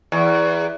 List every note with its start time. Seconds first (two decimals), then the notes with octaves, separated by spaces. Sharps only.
0.12 E2